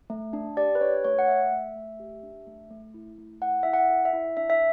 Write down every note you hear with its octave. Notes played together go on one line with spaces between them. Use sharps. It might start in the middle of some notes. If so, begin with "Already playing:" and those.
A3
D4
G4 D5
B4
D4 C#5
A3 C#5
F#5
A3 E5
A3
A3
G4
D4
A3
A3
E4
A3
E4 F#5
E4 E5
F#5
A4
E5
E4
D4 E5
E5